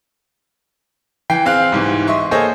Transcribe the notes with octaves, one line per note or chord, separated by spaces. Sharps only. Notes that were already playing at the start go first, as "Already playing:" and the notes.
E3 G5 C7
C4 G#4 F5 F#6
C2 G#2 E3
D#5 E5 C6 C#6
A#3 G#4 A4 C5 C#5 D#5